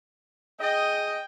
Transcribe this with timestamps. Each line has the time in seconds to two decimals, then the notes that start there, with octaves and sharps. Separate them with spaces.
0.60 G#4 D#5 G5